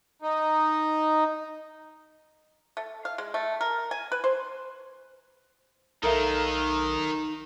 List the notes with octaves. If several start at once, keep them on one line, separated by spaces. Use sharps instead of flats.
D#4
A3
F5
G#3
A3
A#4
G#5
B4
C5
B1 D#3 D#4 A4 A#4 E5 F5